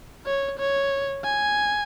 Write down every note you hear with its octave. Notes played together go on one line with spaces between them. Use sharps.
C#5
C#5
G#5